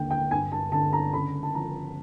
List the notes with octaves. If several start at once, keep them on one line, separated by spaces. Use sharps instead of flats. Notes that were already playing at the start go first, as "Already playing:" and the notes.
Already playing: D#2 D3 G5
G5
G2 G#5
A5
D3 A5
A#5
C#3 B5
A5
F3 A#5